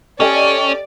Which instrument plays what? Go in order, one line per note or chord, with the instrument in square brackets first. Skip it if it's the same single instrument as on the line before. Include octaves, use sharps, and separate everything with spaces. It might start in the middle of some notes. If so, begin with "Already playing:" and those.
[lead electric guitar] C#4 [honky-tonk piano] G4 A4 D#5 [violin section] D5